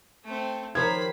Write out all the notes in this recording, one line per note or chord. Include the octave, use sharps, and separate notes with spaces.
A3 C4
D#3 F3 G4 A#4 C5 C#5 B5 G#6